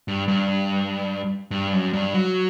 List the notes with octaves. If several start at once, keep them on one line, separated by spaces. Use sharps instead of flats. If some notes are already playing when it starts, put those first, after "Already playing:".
G2
G2
G2
F#2
G2
F#3